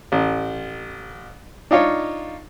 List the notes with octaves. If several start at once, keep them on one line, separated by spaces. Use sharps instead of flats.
A1
D4 D#4 F4 C#5